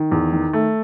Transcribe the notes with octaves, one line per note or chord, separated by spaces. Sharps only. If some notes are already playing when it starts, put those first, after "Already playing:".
Already playing: D#3
E2
D#3
A3